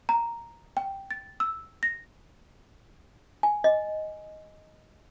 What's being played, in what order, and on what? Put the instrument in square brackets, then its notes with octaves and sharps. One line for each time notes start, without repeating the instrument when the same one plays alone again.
[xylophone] A#5
G5
A6
E6
A#6
[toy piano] G#5
D#5